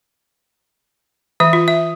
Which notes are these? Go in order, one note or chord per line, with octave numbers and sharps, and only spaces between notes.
E3 E5 D#6
F4
E5